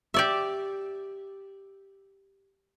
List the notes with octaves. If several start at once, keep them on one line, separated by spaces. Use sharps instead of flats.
G4 D5 E5